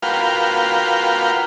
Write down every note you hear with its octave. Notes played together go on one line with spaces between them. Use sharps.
F4 F#4 A#4 B4 F5 G5